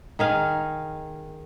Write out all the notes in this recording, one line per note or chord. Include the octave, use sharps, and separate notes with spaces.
D#3 G#4 F5